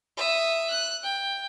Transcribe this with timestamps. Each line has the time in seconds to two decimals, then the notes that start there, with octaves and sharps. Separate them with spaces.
0.17 E5 D#6
0.70 F#6
1.04 G5